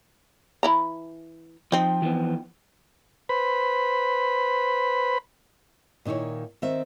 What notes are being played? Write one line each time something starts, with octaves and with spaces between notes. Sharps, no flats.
E3 E4 A#5
F3 C4 D#4
E3 F3 B3
B4 C5 B5
A#2 D#3 D#4 E4 C#5
D#3 C4 E5